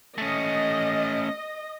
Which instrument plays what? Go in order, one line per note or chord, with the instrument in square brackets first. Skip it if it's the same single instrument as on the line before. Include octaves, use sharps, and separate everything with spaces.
[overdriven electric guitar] A3 C#4 [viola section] D#5